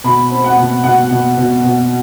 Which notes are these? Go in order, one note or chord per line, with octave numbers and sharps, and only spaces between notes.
B2 B5
C4
F#5
B2
B2 F#5
B2
B2
B2